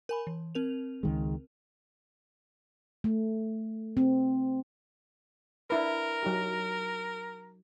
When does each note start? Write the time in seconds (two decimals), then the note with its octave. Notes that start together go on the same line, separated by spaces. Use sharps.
0.09 A#4 G#5 B5
0.27 E3
0.55 C4 A#4 F7
1.03 C#2 D#3 G#3
3.04 A3
3.97 C4
5.70 D4 E4 A#4 B4
6.23 F#3 D#4 G4